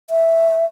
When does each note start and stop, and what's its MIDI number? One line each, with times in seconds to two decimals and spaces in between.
0.10 0.65 76